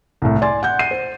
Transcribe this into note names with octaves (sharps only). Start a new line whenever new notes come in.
C2 A2
D5 G#5 C6 D6 A6
F#5 G6
C7 D#7
C5